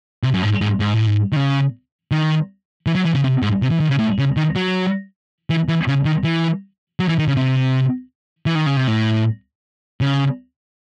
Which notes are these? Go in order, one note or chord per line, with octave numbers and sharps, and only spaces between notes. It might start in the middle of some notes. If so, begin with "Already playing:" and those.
C3
F#2
G#2
G#2
G#2
A2
G#2
D#3
C#3
D#3
E3
F#3
E3
C#3
C3
G#2
C3
E3
D#3
C#3
A2
C#3
D#3
F#3
E3
E3
C#3
D#3
E3
F#3
E3
D#3
C#3
C3
E3
D#3
C#3
C3
A2
C#3